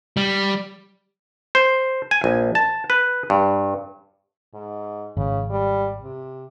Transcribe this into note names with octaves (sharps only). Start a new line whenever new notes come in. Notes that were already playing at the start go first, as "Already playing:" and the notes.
G3
C5
G#5
A#1
A5
B4
G2
G#2
G#1 C#3
G3
C3